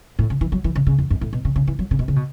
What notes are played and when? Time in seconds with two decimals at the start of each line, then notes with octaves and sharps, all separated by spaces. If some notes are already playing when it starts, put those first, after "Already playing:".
0.19 A2
0.30 C#3
0.41 E3
0.52 F#3
0.64 E3
0.75 C#3
0.87 C#3
0.99 E2
1.10 F#2
1.21 A2
1.33 B2
1.45 C#3
1.56 C#3
1.67 E3
1.79 F#3
1.91 C#3
1.99 B2
2.08 C#3
2.16 B2